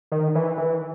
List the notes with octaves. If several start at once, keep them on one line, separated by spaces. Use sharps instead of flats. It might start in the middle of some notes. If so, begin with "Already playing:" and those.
D#3
E3
E3